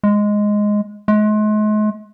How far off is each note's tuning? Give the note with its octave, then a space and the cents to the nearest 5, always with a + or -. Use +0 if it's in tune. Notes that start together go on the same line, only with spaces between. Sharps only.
G#3 +0
G#3 +40